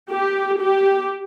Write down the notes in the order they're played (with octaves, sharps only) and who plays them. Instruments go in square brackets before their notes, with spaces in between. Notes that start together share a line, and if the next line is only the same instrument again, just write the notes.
[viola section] G4
G4